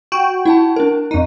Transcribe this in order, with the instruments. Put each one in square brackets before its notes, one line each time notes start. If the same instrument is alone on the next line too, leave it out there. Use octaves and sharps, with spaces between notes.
[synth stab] F#4 G5
[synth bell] E4 F#5 A5
D4 A#4
[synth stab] F2 D#4